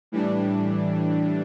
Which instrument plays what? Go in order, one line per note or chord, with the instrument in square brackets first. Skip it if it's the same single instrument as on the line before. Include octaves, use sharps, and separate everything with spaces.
[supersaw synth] A2 E3 G3 D4